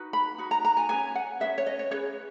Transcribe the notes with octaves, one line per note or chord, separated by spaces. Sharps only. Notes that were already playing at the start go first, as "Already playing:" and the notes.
Already playing: D#4 F#4 B4
B5
D#4 F#4
A#5
A#5
G#5
C#4 G#4 B4 G#5
F#5
C#4 G#4 B4 E5
C#5
D#5
C#5
C#4 G#4 B4 C#5